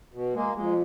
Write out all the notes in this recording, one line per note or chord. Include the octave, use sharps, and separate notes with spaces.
B2
G#3 A#3
F2 G#3